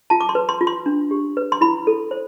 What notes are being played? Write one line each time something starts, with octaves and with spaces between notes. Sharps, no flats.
F4 A5
D6
C6
B4
C6
F4
C6
D4
G4
B4
C6
E4 B5
A4
C5